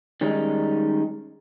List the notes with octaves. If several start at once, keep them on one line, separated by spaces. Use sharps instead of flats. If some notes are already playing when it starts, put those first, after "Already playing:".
D#3 G3 G#3 C#4 D#4